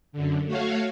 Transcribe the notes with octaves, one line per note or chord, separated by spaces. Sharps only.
F#2 D3
A3 F#4 C#5 F5